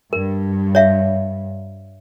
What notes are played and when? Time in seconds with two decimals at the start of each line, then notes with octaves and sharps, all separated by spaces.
0.13 G2 A#4
0.75 C#5 E5 F5